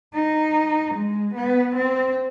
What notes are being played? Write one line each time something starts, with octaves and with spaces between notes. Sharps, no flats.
D#4
G#3
B3
C4